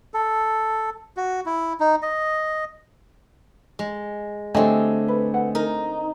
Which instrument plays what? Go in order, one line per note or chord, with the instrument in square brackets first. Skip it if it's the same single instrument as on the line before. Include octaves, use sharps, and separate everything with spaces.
[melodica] A4
F#4
E4
D#4
D#5
[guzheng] G#3
[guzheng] D3 C4 [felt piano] A3 D#5 G#5 [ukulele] G4 C#5
[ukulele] B4
B4 F#5
[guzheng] D#4 [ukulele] A#4